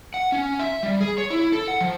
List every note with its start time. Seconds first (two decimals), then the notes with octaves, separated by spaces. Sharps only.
0.14 F#5
0.32 C#4
0.59 E5
0.83 G3
1.01 G#4
1.18 C#5
1.30 E4
1.52 A4
1.68 F#5
1.81 F3